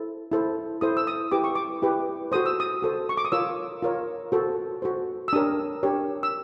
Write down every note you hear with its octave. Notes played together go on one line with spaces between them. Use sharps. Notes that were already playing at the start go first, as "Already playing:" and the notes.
Already playing: E4 A4 C5
E4 A4 C5
E4 A4 C5 D#6
E6
D#6
E4 G4 B4 D6
C#6
D6
E4 G4 B4
F#4 A4 C5 D#6
E6
D#6
F#4 A4 C5
C#6
D6
D#6
F4 A#4 C#5 E6
F4 A#4 C#5
F#4 A4 C5
F#4 A4 C5
E6
D4 G4 A#4 C#5 D#6
D4 G4 A#4 C#5
E6